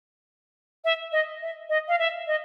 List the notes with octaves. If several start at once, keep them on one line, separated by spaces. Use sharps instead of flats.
E5
D#5
E5
D#5
F5
E5
D#5